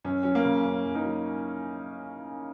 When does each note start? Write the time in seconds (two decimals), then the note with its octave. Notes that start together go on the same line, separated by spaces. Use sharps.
0.04 F#2 C#4
0.23 F#3 C#4
0.35 A#3
0.45 C#3
0.65 F#2 C#4
0.85 F#2
0.95 A#3 D#4
1.05 F#3